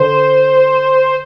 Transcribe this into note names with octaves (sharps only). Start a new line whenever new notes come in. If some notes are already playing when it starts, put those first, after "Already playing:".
Already playing: D3 C5